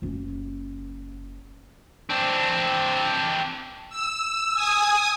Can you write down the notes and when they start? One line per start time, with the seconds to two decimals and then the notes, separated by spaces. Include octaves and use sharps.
0.02 F#1 C#4
2.10 C4 D4
3.90 E6
4.54 G#5 D#6